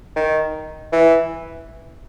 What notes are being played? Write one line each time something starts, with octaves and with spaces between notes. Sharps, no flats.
D#3
E3